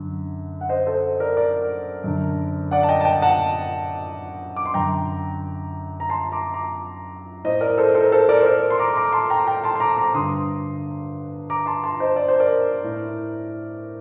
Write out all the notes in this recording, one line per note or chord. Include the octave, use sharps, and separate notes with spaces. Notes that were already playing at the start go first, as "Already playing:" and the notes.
Already playing: F#2 D3
F#5
C5 D#5
A4 C5
A#4 D5
A#4 D5
F#2 D3
D5 F#5
A5
D#5 G5
A5
D#5 G5
F#5 A5
D6
C6
F#2 D3 G5 A#5
A#5
A5 C6
A#5 D6
A#5 D6
A2 C5 D#5
A#4 D5
A4 C5
A4 C5
A#4
A4 C5
A#4 D5
C5
A#4 D5
C6
A#5 D6
A#5 D6
A5 C6
G5 A#5
G5 A#5
A5 C6
C6
A#5 D6
A#5 D6
G2 D3 C6 D#6
A#5 D6
A5 C6
A5 C6
C5 D#5
D5
C5
A#4 D5
A2